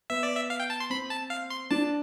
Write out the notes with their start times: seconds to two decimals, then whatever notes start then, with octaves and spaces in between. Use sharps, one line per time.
0.10 B3 E5
0.23 D5
0.35 E5
0.50 F5
0.60 G5
0.70 A5
0.80 C6
0.90 C4 B5
1.10 A5
1.30 F5
1.50 C6
1.71 D4 A5